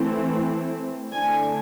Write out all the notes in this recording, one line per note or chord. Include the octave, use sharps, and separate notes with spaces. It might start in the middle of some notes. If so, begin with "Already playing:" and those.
Already playing: E3 A3 C4
D3 A3 D4 G#5